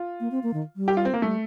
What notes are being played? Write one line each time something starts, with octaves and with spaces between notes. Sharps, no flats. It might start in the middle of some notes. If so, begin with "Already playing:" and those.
Already playing: F4
A#3
C4
A#3
D#3
G3
G4
F4
C4
A#3
G3 A3